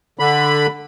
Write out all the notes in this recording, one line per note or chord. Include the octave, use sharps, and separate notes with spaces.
D3 B5